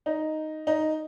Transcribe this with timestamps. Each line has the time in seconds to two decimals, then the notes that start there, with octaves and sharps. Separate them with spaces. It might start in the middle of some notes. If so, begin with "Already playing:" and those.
0.06 D#4
0.67 D#4